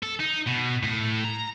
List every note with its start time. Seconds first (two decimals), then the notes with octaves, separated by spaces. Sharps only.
0.03 A4
0.20 D#4
0.47 B2
0.83 A2
1.24 A#5